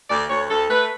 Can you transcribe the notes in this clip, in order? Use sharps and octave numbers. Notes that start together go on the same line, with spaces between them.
D2 D5
D2 C#5
D2 A4
A3 B4